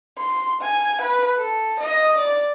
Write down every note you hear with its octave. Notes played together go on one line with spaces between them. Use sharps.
C6
G#5
B4
A4
D#5
D5